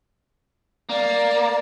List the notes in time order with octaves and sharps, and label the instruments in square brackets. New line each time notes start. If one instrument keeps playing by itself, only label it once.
[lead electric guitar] A#3 [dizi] D5